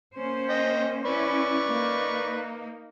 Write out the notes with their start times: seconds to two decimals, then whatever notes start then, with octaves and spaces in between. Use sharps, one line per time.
0.16 A#3 C#4 C5
0.49 D#5 G5
1.05 C#4 E4 B4 D5 C#6
1.66 A#3 D#4